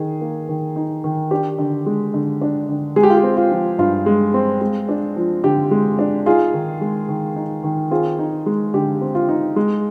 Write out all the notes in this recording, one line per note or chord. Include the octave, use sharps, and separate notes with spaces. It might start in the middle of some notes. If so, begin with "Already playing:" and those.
Already playing: D#3 D#4 G#4
A#3
D#3
D#4
D#3
D4 G4
D3
G#3
D3
D4
D3
G#3 G#4
G4
F4
G4
C4
F4
F3
G2 F4
G#3
C4
G#3
D4
F3
D3 G4
G#3
D4
D#4 F4 G#4
D#3
G#3
D#3
D#4
D#3
C4 F4 G#4
D#4
G#3
D3 G4
C4
F4
D#4
G#3